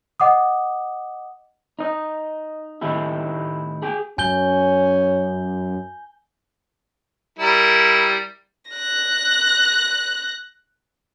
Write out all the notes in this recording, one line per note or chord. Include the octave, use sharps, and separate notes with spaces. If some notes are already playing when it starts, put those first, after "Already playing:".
D#5 F#5 D6 D#6
D#4 D#5
A2 D#3 A3 D#4 E4 G4
G#4 G5
F#2 C#4 G#5 G6 G7
G3 E4 A#4
F#6 A#6